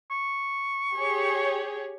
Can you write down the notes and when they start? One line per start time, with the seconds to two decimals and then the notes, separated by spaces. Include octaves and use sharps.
0.11 C#6
0.96 G4 G#4 C#5